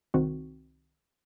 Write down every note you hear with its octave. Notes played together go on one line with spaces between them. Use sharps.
C2 D#3 C4 F#4